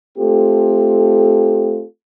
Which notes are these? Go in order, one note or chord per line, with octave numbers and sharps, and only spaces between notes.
A3 C4 F4 G4 A4